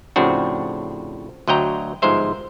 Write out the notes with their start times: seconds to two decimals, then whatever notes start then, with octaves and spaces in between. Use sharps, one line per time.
0.16 A2 C#3 F3 C4 D4 F#4
1.48 D2 F#3 D#5 G5 A#5
2.02 G1 G#2 F3 G#3 C5 E5